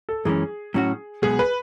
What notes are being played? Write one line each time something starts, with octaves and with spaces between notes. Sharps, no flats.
A4
F#2 E3 G#3 C#4 G#4
A2 F#3 C#4 F#4
B1 B2 G#3 B3 G#4
B4